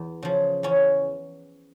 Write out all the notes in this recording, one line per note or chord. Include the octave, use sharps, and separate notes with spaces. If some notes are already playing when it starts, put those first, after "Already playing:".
Already playing: E2
C#3 F3
E2 C#4